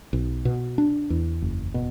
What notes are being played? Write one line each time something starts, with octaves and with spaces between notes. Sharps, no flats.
B1
B2
D4
E2
F#1
B2